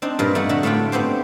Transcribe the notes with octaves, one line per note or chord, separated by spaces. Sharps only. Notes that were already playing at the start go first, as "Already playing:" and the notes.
C4 D4 D#4
G2 A#2 A#4
A3 D#4 F#5
D3 F#4 E5 B5
A2 A3 D4 F4 G5
B3 C4 G4 C5